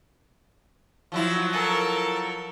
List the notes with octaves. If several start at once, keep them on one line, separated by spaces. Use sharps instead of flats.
F3 F#3 E4
A4 A#4